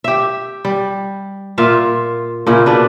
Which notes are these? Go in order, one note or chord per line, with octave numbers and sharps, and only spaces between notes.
G4 E5
G3
A#2 F4 E5 F5
A#2 C#3 E4
B2 D4 B4